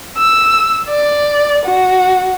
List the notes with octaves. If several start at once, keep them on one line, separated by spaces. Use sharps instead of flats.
E6
D5
F#4